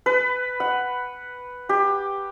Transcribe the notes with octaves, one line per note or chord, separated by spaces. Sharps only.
B4
F#5
G4